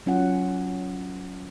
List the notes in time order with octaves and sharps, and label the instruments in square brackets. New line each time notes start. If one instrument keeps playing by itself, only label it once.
[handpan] F#3 C#4 F4 F#5